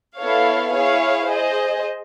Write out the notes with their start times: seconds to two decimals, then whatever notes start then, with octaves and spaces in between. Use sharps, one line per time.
0.20 B3 E4 A4 C#5 F5
0.74 E4 G#4 C#5 F5
1.28 G#4 C5 D#5